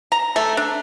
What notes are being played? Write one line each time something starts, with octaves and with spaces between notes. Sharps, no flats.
A#5
A3
D4